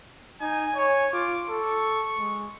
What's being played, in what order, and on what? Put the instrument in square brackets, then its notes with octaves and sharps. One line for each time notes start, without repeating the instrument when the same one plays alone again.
[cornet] D#4 [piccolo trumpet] G#5
[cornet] C#5 [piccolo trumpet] G#5
[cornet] F4 [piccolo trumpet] D6
[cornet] A4 [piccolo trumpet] C#6
[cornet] G#3